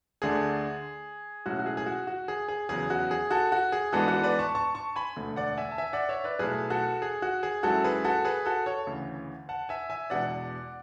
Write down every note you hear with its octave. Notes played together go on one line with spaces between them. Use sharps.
D2 D3 A3 D4 G#4
B1 A2 G#3 C#4 E4 F#4
F#4
G#4
G#4
F#4
F#4
G#4
G#4
E2 C#3 F#3 B3 G#4
F#4
G#4
F#4 A4
F#4
G#4
G#2 E3 G#3 B3 D4 F#4 A4
F#4 A4
B4 D5
A5 C#6
A5 C#6
A5 C#6
G#5 B5
E1 D2 D3 A3
D5 F#5
E5 G#5
A5
E5 G#5
D5 F#5
C#5 E5
B4 D5
B1 B2 A3 E4 G#4 B4
F#4 A4
G#4
F#4
G#4
G#2 F#3 C#4 E4 F#4 A4
G#4 B4
F#4 A4
G#4 B4
F#4 A4
A4 C#5
D2 C#3 E3
F#5 A5
E5 G#5
E5 G#5
E2 B2 G#3 D4 D5 F#5